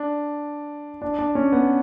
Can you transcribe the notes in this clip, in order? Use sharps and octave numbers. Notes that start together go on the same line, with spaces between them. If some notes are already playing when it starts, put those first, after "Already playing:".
Already playing: D4
D4
D4
C#4
B3